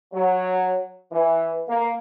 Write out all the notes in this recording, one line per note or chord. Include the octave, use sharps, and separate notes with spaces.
F#3
E3
A#3